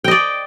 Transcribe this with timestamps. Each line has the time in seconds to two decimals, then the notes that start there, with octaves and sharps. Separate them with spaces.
0.04 G5
0.08 D#5
0.11 D5